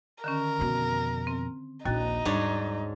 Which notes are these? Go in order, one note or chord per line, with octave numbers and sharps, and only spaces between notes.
D3 D#3 C#4 A#4
F2 B2
C4
A#1 D#2 D#4 E4 F#4 A6
G#2 G3 D4 C#5